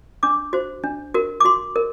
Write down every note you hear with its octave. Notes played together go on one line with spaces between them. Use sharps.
D4 D6
F#4 C5
D4
F#4 A#4
D6
F#4 C6
A#4